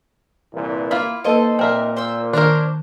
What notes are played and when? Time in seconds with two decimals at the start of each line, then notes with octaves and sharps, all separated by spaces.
0.54 C2 A#2 E3
0.91 A#3 E4 F4 B5
1.24 A#3 D#4 A4 B4 C5 D#5 F5
1.59 A#2 C4 A#4 E5 A5
1.97 C5 E6
2.33 D#3 D4 A#4 C5 C#5 A#5